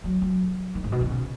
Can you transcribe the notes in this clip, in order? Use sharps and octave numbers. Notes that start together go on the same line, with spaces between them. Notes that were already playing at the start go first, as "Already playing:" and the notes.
F#3
F#3
D#3
G#2
B2
D#3
C#3